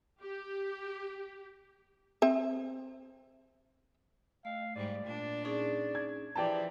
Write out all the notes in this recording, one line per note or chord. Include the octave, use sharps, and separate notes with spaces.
G4
C4 E5
A3 F5
G#2 G3 D5
A#2 D4
C#4 D#4 G#4 D5
G#6
E3 F3 G4 D5 G5 A5